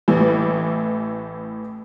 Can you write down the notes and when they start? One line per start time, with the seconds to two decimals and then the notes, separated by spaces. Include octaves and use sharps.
0.08 A1 A2 E3